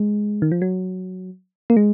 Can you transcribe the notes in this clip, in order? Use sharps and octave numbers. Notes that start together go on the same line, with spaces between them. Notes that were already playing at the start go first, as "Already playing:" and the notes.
Already playing: G#3
D#3
F3
F#3
A#3
G#3